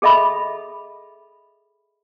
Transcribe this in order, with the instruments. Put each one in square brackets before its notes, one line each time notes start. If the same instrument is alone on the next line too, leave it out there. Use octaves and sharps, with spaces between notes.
[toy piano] G#4 A4 D#5 E5 B5